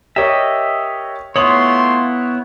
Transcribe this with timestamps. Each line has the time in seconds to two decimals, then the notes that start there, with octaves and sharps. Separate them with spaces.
0.16 G4 A#4 C#5 D#5 E5
1.36 A3 B3 E4 F4 C#5 C6 D#6 F#7